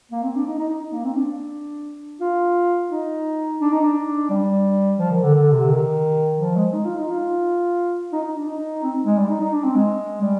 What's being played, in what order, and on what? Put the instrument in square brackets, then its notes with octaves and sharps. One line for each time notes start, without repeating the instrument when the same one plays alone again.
[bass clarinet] A#3
C4
D4
D#4
D#4
D#4
D#4
A#3
C4
D4
F4
D#4
D4
D#4
D4
G3
F3
D#3
D3
D3
C3
D#3
F3
G#3
D#4
F4
D#4
F4
D#4
D#4
D4
D#4
C4
G#3
G3
D#4
D#4
D4
C4
G#3
G3